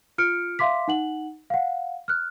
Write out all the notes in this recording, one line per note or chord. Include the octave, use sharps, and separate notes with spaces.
F4 F6 C#7 D7
E5 F5 C6 D6 B6
D#4 F#5 F#7
F5 F#5
F6 F#6